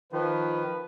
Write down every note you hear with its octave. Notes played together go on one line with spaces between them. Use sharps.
D#3 F3 B4